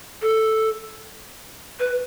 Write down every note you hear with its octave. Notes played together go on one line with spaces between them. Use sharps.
A4
B4